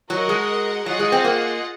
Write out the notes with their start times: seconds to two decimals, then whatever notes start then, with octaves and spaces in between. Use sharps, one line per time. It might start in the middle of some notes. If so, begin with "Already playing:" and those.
0.10 F#3 F#4 A#4 D#5 F#5
0.29 G#3
0.86 F#3 F4 G#4 D#5 F#5
0.99 G#3
1.12 C4
1.24 A#3